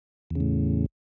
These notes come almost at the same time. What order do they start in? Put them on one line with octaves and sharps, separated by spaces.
E2 C#3 A2